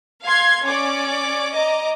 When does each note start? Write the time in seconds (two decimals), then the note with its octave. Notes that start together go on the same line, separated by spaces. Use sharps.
0.23 F5 C6 G#6 C7
0.63 C#4 C#5 D5 D6
1.53 D#5 A#5 D6